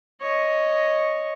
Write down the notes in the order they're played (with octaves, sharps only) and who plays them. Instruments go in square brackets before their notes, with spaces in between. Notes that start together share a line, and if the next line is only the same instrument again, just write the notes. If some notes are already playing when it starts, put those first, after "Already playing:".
[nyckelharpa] C#5 D#5